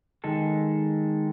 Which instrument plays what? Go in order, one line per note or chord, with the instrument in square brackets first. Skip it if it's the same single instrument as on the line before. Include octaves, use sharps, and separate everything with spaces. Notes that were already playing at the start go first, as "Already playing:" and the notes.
[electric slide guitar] D#3 G#3 A4